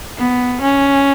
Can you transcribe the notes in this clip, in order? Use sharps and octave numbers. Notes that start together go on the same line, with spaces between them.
B3
C#4